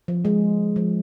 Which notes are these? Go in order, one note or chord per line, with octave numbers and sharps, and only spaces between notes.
F3
G#3
F3